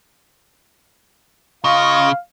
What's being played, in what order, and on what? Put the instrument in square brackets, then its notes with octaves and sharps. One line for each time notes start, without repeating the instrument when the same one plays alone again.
[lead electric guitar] C#3 [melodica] F4 D#5 C#6 [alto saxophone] F5